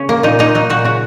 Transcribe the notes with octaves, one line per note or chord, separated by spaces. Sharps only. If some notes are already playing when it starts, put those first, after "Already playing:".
Already playing: C#3 C#4
A#3
A#2 D#4
A#3 D#4
F#3 D#4
A#2 F#4
C#3 F#4